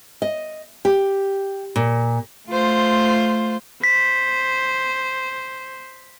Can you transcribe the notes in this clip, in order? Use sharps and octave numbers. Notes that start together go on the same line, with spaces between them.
D#5
G4
A#2
A3 F4 C5
C5 B6